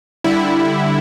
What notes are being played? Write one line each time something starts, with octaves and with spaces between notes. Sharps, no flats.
D3 G3 E4